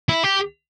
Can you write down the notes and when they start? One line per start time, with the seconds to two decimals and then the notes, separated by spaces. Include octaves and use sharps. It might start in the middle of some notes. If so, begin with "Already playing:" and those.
0.09 E4
0.23 G4